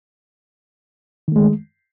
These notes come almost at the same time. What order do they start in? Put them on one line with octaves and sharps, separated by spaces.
D#3 A3 G#3